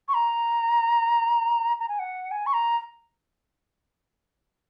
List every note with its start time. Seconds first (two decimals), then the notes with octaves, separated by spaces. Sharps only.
0.08 C#6
0.14 A#5
1.79 A#5
1.88 G#5
1.99 F#5
2.31 G#5
2.46 C#6
2.53 A#5